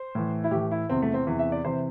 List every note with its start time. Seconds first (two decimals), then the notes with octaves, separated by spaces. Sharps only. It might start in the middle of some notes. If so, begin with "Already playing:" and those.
Already playing: C5
0.15 A2 E3
0.44 E4
0.51 A2 E3 G4
0.71 E4
0.89 E2 C3 E3 C4
1.02 A3
1.14 C4
1.27 E2 C3 E3
1.39 E5
1.52 D5
1.65 C3 E3 C5